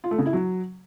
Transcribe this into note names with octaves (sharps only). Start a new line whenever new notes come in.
F4
A3
C#3
E4
F#3